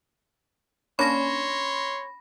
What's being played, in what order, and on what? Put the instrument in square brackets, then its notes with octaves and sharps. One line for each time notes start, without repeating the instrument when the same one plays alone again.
[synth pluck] A#3 C#4 D4 [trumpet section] C#5 C6 [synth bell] B5 A#6